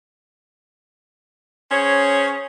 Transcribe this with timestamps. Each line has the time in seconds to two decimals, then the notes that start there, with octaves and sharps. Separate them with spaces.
1.70 C#4 G#4 C5 C#5